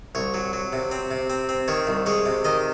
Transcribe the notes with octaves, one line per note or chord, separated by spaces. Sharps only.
C2 C#5
F#3
F#3
C3
C4
C3
C4
C4
D#3 C#5
C2
G#3 C#5
C3
D#3 D#5